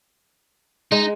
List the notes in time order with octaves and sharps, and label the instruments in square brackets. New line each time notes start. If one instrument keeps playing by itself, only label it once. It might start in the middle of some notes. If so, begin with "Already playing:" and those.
[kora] G#3 [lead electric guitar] D#4